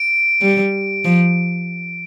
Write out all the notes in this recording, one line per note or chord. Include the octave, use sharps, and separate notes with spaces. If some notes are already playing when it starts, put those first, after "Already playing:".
Already playing: D7
G3
F3